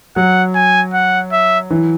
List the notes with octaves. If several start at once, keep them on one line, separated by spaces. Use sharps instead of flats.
F#3 F#5
G#5
F#5
E5
E3